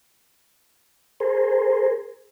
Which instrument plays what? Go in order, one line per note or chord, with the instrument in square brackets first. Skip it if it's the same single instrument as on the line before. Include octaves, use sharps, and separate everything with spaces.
[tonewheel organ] G#4 A#4 C5